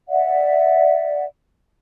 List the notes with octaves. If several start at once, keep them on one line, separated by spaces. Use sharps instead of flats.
D5 E5 F#5